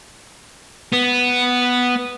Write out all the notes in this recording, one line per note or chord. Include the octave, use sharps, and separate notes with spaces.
B3